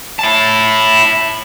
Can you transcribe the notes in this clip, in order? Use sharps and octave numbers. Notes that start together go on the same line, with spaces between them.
E4 A5